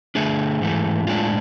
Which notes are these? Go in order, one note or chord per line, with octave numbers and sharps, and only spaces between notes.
D3 A3 D4 G#4
G#2 E3 A3
A2 G#3 D4 F4